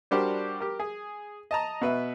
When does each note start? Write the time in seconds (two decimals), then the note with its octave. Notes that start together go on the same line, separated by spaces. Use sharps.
0.11 G3 D4 F#4 G4 A#4 C5
0.60 G4 A#4
0.80 G#4
1.51 D#5 A5 A#5
1.81 B2 B4 E5